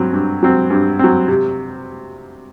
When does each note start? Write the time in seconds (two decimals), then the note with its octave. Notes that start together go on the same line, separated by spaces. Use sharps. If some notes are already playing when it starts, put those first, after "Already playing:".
Already playing: G2 F#3 C4
0.13 G2
0.43 F#3 C4
0.70 G2
0.99 F#3 C4
1.28 C3